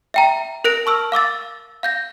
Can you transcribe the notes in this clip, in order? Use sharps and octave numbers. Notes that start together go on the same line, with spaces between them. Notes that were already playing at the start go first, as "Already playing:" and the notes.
E5 G5 A#5
A#4 F#6 A#6 D7 F7
A5 C#6 E6 F6
F5 D6 E6 A6
F5 G6 A#6